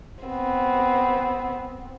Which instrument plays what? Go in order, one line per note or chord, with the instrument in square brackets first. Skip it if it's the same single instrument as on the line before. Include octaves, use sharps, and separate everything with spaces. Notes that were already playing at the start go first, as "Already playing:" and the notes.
[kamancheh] B3 C4